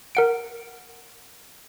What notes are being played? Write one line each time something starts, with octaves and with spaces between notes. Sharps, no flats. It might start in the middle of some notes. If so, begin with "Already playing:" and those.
A#4 F#5 D7